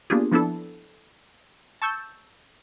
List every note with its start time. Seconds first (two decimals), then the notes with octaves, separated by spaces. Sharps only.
0.10 A#3 B3 D4 F4 G4 G#4
0.32 F3 B3 D4 E4 A4
1.82 A5 C#6 E6 G6